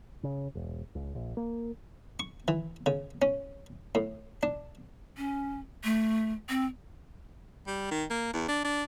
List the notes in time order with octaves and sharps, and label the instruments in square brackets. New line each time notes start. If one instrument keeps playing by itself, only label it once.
[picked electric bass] C#3
E1
C#2
A#1
A#3
[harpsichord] C#6
E3
C#3
C#4
A2
D4
[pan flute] C#4
A3
C4
[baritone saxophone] G3
D#3
A#3
E2
D4
D4